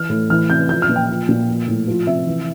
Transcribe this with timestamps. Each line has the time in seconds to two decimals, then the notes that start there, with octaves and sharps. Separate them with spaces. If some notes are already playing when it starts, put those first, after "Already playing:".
Already playing: E3 F6
0.10 A2
0.30 E3 F6
0.50 C3 G6
0.69 F3 G6
0.82 F6
0.89 A#2
0.96 G5
1.09 F3
1.29 A#2
1.48 F3
1.68 A2
1.87 F3
2.07 C3 E5
2.27 E3